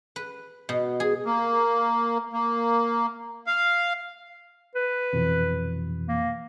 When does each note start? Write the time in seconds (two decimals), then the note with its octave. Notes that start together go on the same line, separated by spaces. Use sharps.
0.16 B4
0.69 B2
1.00 G#4
1.26 A#3
2.33 A#3
3.47 F5
4.75 B4
5.13 F2 B2 E3
6.08 A#3